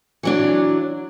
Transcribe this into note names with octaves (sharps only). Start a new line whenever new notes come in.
E3 F#3 D4